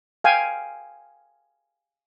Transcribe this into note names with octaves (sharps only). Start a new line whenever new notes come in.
F5 G5 G#5